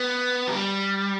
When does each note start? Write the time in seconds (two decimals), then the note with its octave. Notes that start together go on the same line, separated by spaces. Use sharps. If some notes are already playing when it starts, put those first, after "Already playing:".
Already playing: B3
0.48 F#3
0.51 G3